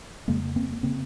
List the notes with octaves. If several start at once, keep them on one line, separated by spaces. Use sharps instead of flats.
F2 C#3 G#3 A#3
A#3 C4
C#3 A#3 C4